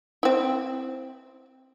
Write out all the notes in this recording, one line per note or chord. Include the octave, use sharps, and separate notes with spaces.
C4 E4